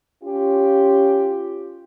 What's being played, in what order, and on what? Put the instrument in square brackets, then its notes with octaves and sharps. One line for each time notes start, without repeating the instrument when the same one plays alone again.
[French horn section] C#4 F4 G4